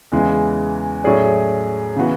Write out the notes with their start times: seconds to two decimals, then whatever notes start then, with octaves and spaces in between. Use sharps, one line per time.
0.12 E2 C#3 E3 G#3
1.04 A2 F#3 C#4 G#4 D5
1.96 C#3 E3 B3 F#4